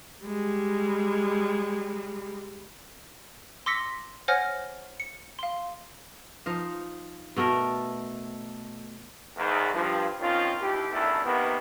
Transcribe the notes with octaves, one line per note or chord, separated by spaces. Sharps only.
G3 G#3
C6 D6 E6 A#6 B6 C#7
C5 C#5 F#5 G#5 F6 A#6
C#7
F5 C6
F3 D#4 F5
B2 A3 A4 A#4
E2 G#2 D#3
G2 F3
D#3 F3 C4 C#4 F4
A#1 D#2 E4 G4
A1 E2 D#3 D4 E4 A4
C3 D#3 A#3 B3